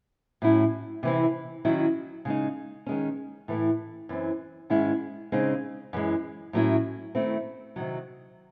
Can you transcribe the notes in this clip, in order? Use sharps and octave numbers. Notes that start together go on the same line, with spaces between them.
A2 F#3 C#4 E4
C3 E3 C4 E4
D#3 F#3 C#4 E4
C#3 G#3 D#4
D#3 G#3 C#4
A2 E3 A3
F#2 E3 C4
G#2 D#3 G#3 C#4 E4
C#3 G#3 C4 D#4
F#2 E3 G#3
A2 F#3 A3 C#4 E4
D#3 A3 C4 E4
C3 D#3 F#3